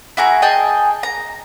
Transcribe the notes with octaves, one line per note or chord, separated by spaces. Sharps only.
E4 F#4 G#4 A#5
G#4 D#5 G5 A5
A#5